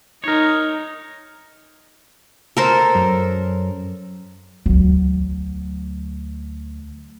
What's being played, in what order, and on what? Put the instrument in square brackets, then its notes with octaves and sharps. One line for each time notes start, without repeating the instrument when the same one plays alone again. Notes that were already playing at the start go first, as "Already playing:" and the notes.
[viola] D#4 [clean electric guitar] A#4 C#5
[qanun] A4 A#4 C5
[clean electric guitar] F#2
[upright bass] D2 F#3